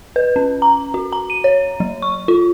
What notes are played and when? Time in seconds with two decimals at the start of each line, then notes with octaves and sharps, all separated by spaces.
0.16 B4
0.36 C#4
0.62 A#5
0.94 F#4
1.13 A#5
1.30 D#7
1.44 C#5
1.80 F#3
2.02 C#6
2.28 F4